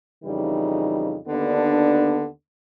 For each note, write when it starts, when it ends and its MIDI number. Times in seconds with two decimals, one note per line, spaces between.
0.24 1.16 41
0.24 1.16 49
0.24 1.16 52
0.24 1.16 55
0.24 1.16 63
1.28 2.26 39
1.28 2.26 50
1.28 2.26 59
1.28 2.26 62